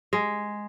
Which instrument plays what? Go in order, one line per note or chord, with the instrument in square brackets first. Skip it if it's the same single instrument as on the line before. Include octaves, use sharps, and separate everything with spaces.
[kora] G#3